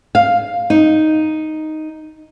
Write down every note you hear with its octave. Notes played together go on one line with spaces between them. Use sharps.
F5
D#4